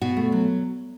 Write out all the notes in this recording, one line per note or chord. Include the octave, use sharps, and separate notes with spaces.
B2 F#4
A3
F#3